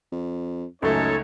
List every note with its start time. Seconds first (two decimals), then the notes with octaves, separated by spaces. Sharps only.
0.12 F2
0.82 C#2 F#2 A3 C#4 D#4 A4 C#5